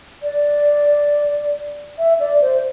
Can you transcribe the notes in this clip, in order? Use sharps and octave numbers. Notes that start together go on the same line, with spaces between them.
D5
E5
D5
C5